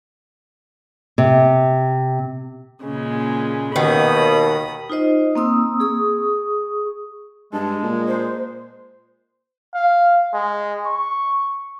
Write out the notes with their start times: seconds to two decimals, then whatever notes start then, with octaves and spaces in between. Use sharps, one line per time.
1.18 C3
2.84 A#2 C#3 G#3
3.76 D#2 B2 D#3 B5 D#6
4.90 D#4 F4 C5 D#5
5.35 A#3 C4 D#6 E6
5.80 G#4 C#6 D#6
7.53 G2 G#3 A5
7.83 A#2
8.08 C5
9.74 F5
10.33 G#3
10.86 C#6